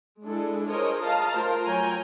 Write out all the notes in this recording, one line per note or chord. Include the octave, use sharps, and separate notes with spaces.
G#3 D4 E4 G#4 A4
F4 G#4 A#4 C5 C#5 D#5
D#5 F5 A5 A#5
A3 F4 A#4 C5
F#3 C#5 G5 G#5 A#5